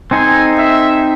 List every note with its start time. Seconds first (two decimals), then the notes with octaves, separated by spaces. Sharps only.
0.11 C4 D#4 A4 C5 G#5
0.58 E5